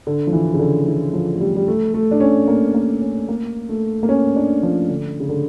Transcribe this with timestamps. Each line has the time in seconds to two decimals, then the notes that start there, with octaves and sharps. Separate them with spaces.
0.07 D3
0.27 F3
0.33 E3
0.54 C#3
0.59 D3
0.87 E3
1.13 F3
1.35 A3
1.40 G3
1.56 G3
1.68 A3
1.94 A3
2.11 D4
2.20 C#4
2.48 A#3
2.74 A#3
3.01 C#4
3.29 A#3
3.69 A3
4.03 A#3
4.09 C#4
4.36 D4
4.63 F3
4.89 D3
5.20 C#3
5.29 D3